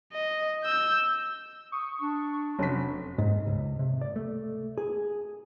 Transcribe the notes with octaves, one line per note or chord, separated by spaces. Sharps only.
D#5
E6 G6
C#6 D#6
D4
F1 F#3 C#4 B6
G#2
C#2
C3
D5
A3
G#4